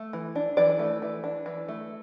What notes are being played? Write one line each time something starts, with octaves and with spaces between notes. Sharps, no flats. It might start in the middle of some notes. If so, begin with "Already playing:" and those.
Already playing: A3
E3
D4
E3 D5
A3
E3
D4
E3
A3